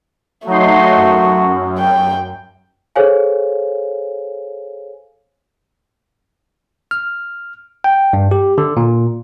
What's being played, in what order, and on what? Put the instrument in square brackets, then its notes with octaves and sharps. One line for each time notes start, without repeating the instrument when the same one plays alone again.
[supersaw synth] F#3 D#4 C6 [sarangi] A3 [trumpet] F#4
[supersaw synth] F#2
[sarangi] G5
[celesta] G#4 A4 C5 C#5 F5 G#5
[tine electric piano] F6
G5
G2
G4
D3
A#2